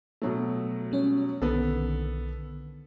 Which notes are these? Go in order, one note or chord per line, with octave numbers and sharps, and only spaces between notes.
B2 F#3 A3
G3 C#4 C#5
B1 D3 D#3 B3 A4